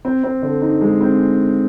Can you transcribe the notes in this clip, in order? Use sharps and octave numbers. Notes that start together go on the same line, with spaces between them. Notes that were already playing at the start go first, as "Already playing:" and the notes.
C4
C4
D3
D#4
G#3
C4